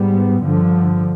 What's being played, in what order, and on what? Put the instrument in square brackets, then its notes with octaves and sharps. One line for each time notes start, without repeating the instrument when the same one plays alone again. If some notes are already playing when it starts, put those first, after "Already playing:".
Already playing: [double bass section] G#2 G3 B3
G2 D3 F3